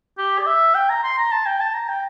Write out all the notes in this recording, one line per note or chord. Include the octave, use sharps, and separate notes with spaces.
G4
D5
E5
G5
A#5
C6
A#5
A5
G5
A5
A#5
G5